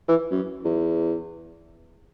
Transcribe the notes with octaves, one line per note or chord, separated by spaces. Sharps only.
E3
F#2
E2